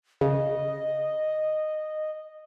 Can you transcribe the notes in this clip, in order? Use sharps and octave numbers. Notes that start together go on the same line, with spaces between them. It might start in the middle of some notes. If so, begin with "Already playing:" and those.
C#3 D#5